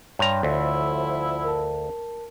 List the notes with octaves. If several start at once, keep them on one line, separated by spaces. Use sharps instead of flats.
G2 C#5 A#5 C6
D2 F3 E4
A#4 A5